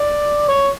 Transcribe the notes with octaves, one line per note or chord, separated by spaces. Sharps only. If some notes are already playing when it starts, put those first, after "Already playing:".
Already playing: D5
C#5